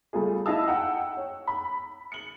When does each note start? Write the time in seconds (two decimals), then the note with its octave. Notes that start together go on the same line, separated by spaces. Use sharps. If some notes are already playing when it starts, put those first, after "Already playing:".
0.13 G3 A3 F4 G#4
0.46 E4 D#5 F5 A5 E6
0.68 F#5 G5
1.17 C#5
1.47 B5
2.12 C#7 F#7